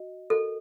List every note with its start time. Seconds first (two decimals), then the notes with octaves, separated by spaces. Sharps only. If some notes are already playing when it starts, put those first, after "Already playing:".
Already playing: F#4 D#5
0.30 F#4 A4 A#4 D#5